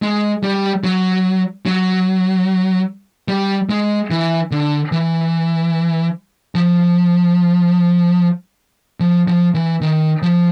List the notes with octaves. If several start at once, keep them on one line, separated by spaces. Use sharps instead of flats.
G#3
G3
F#3
F#3
G3
G#3
E3
D3
E3
F3
F3
F3
E3
D#3
F3